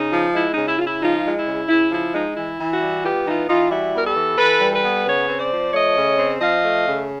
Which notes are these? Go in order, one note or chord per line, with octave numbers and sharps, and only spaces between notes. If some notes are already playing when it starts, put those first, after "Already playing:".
Already playing: C#3 D#4
F3
G#3 E4
C#3 D#4
E4
C#3 F4
E4
F3 D#4 F4
G#3
E4
C#3
C#3 E4
F3 E4
G#3 D#4
E3 E4
E3
E4 F#4
G3
B3 F4 G4
E3 D#4 F4
E3 D#4 F4
G3 E4 F#4
B3 A#4
G4 A4
E3
E3 A4 B4
G3
A4 B4
B3
C#3 B4 C#5
C4
C5 D5
F3
A3 C#5 D#5
C#3
C4
F3 D#5 F5
A3
C#3